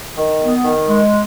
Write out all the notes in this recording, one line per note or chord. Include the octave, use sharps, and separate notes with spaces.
D#3
B3
D#3
G#3